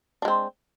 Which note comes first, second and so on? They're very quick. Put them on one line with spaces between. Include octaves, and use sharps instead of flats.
D4 G#3 C4